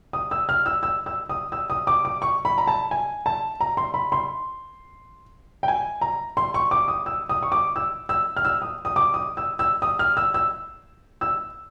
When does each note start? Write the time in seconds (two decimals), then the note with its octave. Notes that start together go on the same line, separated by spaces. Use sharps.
0.13 D#6
0.31 E6
0.49 F6
0.66 E6
0.83 E6
1.06 E6
1.29 D#6
1.52 E6
1.70 D#6
1.87 D6
2.05 D6
2.22 C#6
2.45 B5
2.58 A#5
2.67 A5
2.91 G#5
3.26 A5
3.61 A#5
3.77 C6
3.94 B5
4.12 C6
5.63 G5
5.68 G#5
6.01 A#5
6.37 C6
6.54 C#6
6.71 D6
6.88 D#6
7.06 E6
7.29 D#6
7.43 C#6
7.52 D6
7.76 E6
8.09 E6
8.37 F6
8.45 E6
8.62 D#6
8.85 D#6
8.96 D6
9.14 D#6
9.37 E6
9.59 E6
9.82 D#6
9.99 F6
10.17 E6
10.34 E6
11.21 E6